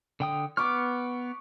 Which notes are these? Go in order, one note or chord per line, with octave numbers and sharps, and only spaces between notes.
D3 G5 D#6
B3 C#6 D6 F6